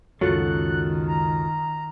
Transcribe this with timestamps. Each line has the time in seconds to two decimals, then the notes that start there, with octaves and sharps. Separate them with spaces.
0.21 C#2 F#2 D#3 F#3 F4 F#4 A4 F#6
1.07 A#5